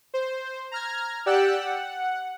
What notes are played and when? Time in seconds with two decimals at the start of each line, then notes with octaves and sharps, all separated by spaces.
0.14 C5
0.71 A#5 F6 G#6
1.26 G4 D5 F#5 G5 E6 F#6
1.61 F#5